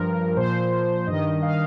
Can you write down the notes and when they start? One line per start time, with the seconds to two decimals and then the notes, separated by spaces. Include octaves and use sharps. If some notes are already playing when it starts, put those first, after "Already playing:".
Already playing: G2 F3 A#4
0.36 A#2 F3 C5
1.07 G2 D#3 D#5
1.42 F5